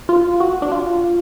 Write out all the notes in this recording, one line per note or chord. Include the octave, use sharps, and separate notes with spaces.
F4
F#4
D4
F4